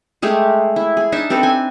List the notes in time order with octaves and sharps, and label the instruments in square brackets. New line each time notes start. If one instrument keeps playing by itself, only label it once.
[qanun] G#3 A3 G4 G#4
E4
G#4
D4 D#4 E5 A5
C4 G4 A4 B4
G#5